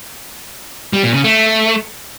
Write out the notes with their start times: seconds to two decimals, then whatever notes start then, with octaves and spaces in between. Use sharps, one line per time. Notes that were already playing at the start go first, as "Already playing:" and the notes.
0.93 G3
1.04 A#2
1.14 C#3
1.24 A3